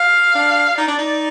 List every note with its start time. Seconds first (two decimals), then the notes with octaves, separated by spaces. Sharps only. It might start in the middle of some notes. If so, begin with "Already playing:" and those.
Already playing: F5
0.35 D4
0.77 D#4 D5
0.88 D4
0.98 D#4